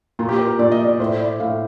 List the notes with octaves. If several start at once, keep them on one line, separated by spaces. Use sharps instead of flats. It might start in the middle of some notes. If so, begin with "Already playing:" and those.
A#2 F4
G4
A#4
A#2 D5
D#5
D5
A2 C5
D5
A2 F5